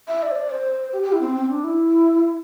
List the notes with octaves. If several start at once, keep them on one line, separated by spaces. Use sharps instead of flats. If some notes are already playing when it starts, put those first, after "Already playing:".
E5
D5
C5
D5
C5
G4
G4
E4
C4
C4
D4
E4